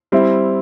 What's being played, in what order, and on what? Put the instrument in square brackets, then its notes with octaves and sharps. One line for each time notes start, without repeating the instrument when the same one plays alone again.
[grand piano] G3 C4 E4